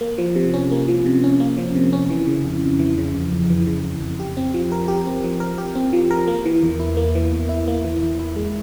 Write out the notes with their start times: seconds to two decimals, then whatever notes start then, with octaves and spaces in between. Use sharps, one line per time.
0.01 A#3
0.18 F3
0.36 C3
0.54 C#4
0.72 A#3
0.88 F3
1.06 C3
1.24 C#4
1.40 A#3
1.58 F3
1.75 C3
1.93 C#4
2.10 E3
2.27 C#3
2.45 F2
2.62 F2
2.79 E3
2.98 C#3
3.15 F2
3.33 F2
3.50 E3
3.67 C#3
3.84 F2
4.01 F2
4.20 G4
4.37 C4
4.54 F3
4.72 A#4
4.88 G4
5.07 C4
5.24 F3
5.40 A#4
5.58 G4
5.75 C4
5.93 F3
6.11 A#4
6.27 A#3
6.46 E3
6.63 E2
6.80 E4
6.97 A#3
7.15 E3
7.32 E2
7.49 E4
7.68 A#3
7.84 E3
8.02 E2
8.19 E4
8.36 G#3